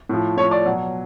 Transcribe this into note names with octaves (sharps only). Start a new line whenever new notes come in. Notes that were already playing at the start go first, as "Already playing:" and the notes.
A2 F3
A2 F3 C#5
D5
B2 F#3